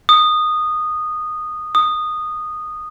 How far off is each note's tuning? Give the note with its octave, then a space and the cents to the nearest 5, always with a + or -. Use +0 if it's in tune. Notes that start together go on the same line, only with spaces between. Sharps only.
D#6 -15
D#6 -15